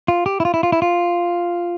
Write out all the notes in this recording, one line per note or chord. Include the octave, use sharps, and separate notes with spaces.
F4
G4
E4
F4
E4
F4
E4
F4